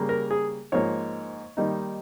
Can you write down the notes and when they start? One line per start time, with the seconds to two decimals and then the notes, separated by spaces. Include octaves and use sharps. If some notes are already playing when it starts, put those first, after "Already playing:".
Already playing: C#3 G3 A#3
0.09 A#4
0.31 G#4
0.72 G#2 F3 A#3 D#4 C#5
1.57 D#3 G3 A#3 D#4